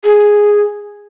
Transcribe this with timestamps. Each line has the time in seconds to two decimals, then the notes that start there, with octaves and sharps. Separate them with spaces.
0.04 G#4